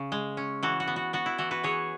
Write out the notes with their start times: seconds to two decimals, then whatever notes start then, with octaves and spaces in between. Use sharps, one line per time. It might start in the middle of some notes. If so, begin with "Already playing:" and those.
Already playing: C#3
0.12 G#3
0.37 C#4
0.63 E3 F#4
0.80 F#4
0.88 B3
0.96 F#4
1.13 B3 F#4
1.26 E4
1.38 E3 F#4
1.51 F#4 B4
1.63 E3 G#4 C#5